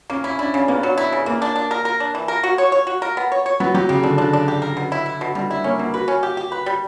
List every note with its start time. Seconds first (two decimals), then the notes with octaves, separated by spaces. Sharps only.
0.10 A#3 C#4
0.24 C#4 E4
0.39 D4 E4
0.54 C#3 C#4
0.68 A#3 B3
0.83 F#3
0.98 E4
1.12 C#3
1.26 E3 A#3
1.42 D4
1.56 D4
1.71 A#4
1.85 A#4
2.00 D4
2.15 E3
2.28 A#4
2.43 F#4
2.58 C#5
2.72 C#5
2.87 F#4
3.02 A#4
3.17 B3
3.32 C#5
3.46 C#5
3.60 F#3 B3
3.74 F#3 G4
3.89 C#3 G4
4.03 D3 D4
4.18 D3 D4
4.33 D4
4.48 G4
4.62 A#4
4.77 B2
4.92 E4
5.06 E4
5.21 B2
5.35 B2 G3
5.50 G3 E4
5.64 A#3 C#4
5.79 B2 A#3
5.94 F#4 B4
6.08 C#4
6.23 G4
6.37 G4
6.52 B4
6.66 G3